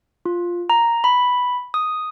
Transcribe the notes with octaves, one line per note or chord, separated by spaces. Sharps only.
F4
A#5
B5
D#6